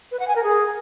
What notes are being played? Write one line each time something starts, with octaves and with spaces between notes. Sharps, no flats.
B4
F#5
G#5
A#4
G#4